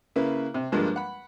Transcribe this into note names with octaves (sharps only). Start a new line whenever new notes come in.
C#3 A#3 E4 B4
C3
G2 F3 G3 G#3 A#3 D4
F#5 B5